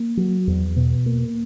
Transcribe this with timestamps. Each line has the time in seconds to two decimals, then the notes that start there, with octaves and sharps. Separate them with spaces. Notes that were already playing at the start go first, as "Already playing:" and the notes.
Already playing: A#3
0.17 F#3
0.47 E2
0.76 B2
1.06 A#3